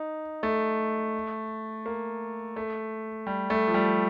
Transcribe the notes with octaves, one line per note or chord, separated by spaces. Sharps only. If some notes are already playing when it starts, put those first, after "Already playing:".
Already playing: D#4
A3
A#3
A3
G3
A3
F3
G3